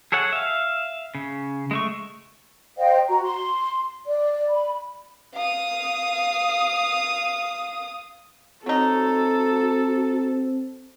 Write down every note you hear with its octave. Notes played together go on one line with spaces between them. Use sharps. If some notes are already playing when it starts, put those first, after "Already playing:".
G#4 A4 C#5 F#5
E5 F5
C#3
G#3 A3 C#6
C5 D#5 F5 G5
F#4 A#5
C6
D5
B5
F5 D#6
F#3 C4 D#4 F#4 A4